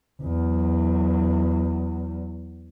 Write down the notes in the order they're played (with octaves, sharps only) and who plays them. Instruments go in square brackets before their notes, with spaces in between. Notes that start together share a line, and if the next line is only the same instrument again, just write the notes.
[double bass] E2 F#3